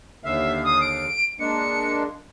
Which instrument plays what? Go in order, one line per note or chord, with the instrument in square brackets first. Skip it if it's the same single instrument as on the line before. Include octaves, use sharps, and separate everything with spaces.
[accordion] D#2 D3 F5 [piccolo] E5
[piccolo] D#6
D7
[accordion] G#3 A#3 D4 [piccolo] C#7